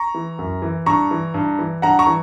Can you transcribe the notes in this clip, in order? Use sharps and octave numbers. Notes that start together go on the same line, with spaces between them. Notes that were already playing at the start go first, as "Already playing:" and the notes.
Already playing: A#5 C#6
E3
F#2
E3
G2 A#5 C#6
E3
G2
E3
G2 F#5 A#5
A#5 C#6
E3